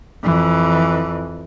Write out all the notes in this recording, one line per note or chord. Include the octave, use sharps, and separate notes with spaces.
F2 E3